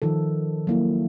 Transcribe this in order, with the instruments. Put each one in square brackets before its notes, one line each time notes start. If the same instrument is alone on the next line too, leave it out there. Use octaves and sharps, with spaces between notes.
[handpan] D#3 F3 A4
F#3 A#3 E4